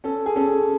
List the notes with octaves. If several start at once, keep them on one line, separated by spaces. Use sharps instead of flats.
C#4 A4
G#4
C#4 A4